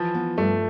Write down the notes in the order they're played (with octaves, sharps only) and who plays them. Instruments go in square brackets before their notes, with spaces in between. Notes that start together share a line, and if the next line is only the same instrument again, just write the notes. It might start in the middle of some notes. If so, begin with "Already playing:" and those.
Already playing: [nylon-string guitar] E3 [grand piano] F3
[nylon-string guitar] B3
[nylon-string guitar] G2 [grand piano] A3